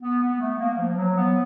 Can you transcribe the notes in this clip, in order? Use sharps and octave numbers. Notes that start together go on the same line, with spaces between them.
B3
B3
A3
A#3
F3
F#3
B3